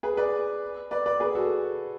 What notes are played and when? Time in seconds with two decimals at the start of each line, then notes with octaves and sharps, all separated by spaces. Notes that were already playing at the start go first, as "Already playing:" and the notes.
0.03 G#4 B4
0.17 B4 D5
0.91 B4 D5
1.06 B4 D5
1.20 G#4 B4
1.35 F#4 A4